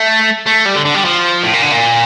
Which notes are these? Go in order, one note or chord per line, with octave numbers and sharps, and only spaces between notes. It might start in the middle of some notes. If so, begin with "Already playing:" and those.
Already playing: A3
A3
G3
D3
D3
G3
F3
A2
A#2
D3
A#2